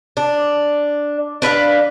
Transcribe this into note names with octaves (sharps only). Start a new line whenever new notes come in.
D4
D4 B4 E5 F5